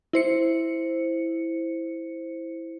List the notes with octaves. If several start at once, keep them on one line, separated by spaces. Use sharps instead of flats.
E4 C5 C#7